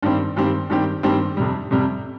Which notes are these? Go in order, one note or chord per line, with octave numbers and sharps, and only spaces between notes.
G2 D#3 G3 C4 G4
G2 D#3 G3 C4 G4
G2 D#3 G3 C4 G4
G2 D#3 G3 C4 G4
F2 C3 G3
F2 C3 G3